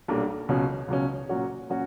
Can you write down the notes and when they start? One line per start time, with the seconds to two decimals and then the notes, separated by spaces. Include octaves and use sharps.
0.08 B1 A#2 G3 A#3 D4
0.49 C#2 B2 F#3 C#4
0.88 C#2 B2 F#3 C#4
1.29 A#2 F#3 C#4 F#4
1.70 A#2 F#3 C#4 F#4